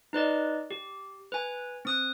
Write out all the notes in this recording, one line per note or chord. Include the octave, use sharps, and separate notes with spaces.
D#4 B4 D5 D#5
G4
B4 G#5
C4 D#6 F#6